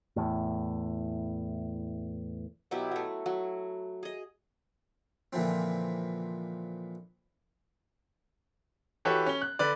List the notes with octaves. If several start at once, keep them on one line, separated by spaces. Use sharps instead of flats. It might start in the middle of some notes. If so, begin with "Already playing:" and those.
E2 A2
B2 F#3 E4 G4
F#3 A3
F#3
G#4 D#5
A#2 D3 E3 F3 C4
E3 F#4 G4 A4 B4 C#5
C#4 G7
F#6
D3 B4 D5